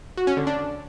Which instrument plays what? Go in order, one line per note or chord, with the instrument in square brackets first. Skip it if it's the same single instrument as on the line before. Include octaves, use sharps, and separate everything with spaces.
[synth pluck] F#4
C#4
D3
D4